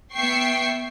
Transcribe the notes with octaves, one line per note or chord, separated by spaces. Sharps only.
B3 E5 G5 C#6 C7